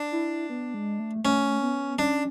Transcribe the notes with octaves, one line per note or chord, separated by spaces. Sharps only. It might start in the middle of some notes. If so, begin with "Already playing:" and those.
Already playing: D4
E4
B3
G#3
A3
A3 C#4
B3
C#4 D4